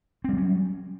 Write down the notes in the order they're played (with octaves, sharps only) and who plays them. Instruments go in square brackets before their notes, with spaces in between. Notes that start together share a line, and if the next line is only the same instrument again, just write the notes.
[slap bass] C4
G3
F#3
C#4